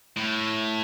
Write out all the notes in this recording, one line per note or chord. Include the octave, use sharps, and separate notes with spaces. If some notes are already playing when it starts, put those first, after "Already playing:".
A2